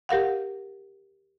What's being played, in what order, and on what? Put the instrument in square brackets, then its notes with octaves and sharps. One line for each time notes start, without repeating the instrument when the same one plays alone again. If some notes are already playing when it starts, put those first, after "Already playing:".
[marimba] G4 A#4 F5 F#5